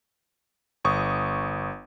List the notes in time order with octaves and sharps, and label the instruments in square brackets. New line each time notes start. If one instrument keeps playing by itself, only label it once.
[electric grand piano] G1 C#6 D#6